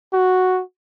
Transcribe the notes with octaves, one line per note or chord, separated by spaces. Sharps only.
F#4